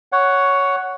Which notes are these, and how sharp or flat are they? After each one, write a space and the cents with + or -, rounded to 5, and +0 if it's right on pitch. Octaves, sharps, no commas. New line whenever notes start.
C#5 +10 F#5 +0